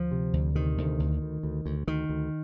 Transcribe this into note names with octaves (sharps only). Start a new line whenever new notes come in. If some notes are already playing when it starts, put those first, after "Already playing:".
Already playing: D2 F3
C3
D2
C3 D#3
D2
D2
D2
D2
D2
D2 D#3
D2